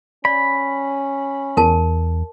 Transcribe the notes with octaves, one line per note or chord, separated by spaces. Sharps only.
C#4 D5 B5
E2 A#4 A5